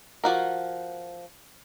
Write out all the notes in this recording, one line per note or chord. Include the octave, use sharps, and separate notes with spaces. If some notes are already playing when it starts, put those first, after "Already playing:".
F3 F#4 A#4